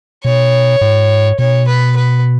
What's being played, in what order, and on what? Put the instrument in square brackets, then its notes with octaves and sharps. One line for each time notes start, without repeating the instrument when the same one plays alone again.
[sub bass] B2 [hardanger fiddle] C#5
[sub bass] G#2
[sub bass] B2 [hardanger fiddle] C#5
[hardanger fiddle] B4
B4